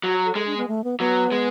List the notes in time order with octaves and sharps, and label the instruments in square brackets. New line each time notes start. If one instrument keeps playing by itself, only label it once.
[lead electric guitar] F#3 [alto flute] F#4
[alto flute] A4
[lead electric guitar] G#3 [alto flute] A4
[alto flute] D4
B3
A3
B3
[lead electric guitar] F#3 [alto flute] B3
[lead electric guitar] G#3